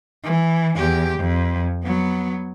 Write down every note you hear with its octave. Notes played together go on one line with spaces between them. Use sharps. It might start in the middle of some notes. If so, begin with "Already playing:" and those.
E3
E2 G4
F2
F#3 B3